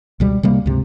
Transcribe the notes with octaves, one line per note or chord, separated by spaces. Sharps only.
C#2 B2 G3
C3 G3 A#3
C#2 G2 C3